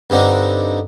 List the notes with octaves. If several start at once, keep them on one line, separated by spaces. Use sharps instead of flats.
G2 D3 C4 D#4